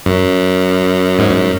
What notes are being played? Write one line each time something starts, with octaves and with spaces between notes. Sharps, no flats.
F#2
G#2
F#2